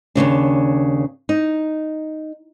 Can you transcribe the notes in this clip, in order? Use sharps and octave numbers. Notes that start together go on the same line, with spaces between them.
D#2 A#2 C#3 D4
D#4